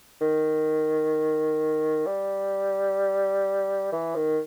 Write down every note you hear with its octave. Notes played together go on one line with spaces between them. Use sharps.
D#3
G3
E3
D#3